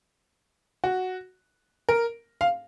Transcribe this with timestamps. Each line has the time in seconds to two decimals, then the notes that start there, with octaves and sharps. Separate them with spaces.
0.84 F#4
1.89 A#4
2.41 F5